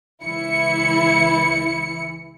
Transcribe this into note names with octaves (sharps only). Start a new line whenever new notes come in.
C#2 E3 E4 C#7